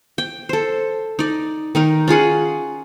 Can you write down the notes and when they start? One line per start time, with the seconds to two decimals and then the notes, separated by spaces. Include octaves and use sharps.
0.18 G5
0.49 A4 C5
1.19 D#4 D5
1.75 D#3 D#4 A#4
2.08 C#4 F4 G#4 F#5